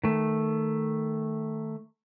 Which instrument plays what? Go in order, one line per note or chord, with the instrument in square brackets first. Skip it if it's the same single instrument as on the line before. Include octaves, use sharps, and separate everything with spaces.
[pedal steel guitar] D#3 A3